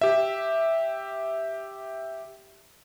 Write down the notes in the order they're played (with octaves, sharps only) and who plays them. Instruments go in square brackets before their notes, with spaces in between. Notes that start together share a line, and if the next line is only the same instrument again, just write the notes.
[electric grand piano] G4 E5